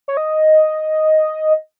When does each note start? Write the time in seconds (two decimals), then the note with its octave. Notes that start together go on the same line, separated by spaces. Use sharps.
0.08 C#5
0.17 D#5